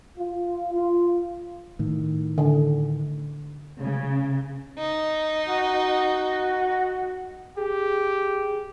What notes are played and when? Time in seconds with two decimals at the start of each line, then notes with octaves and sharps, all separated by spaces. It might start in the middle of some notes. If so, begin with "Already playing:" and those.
0.18 F4
0.73 F4
1.79 A2 D#3
2.38 D3
3.81 C#3
4.78 D#4
5.48 F#4
7.58 G4 G#4